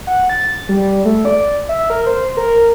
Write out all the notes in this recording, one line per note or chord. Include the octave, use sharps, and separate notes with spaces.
F#5
A6
G3
A3
D5
E5
A#4
C5
A#4